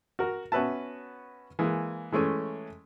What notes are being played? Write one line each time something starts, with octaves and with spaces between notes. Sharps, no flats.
F#4 A#4
B3 C#4 F#4 B4 E5 A5
E3 G#3 A#3
E3 G#3 A3 C#4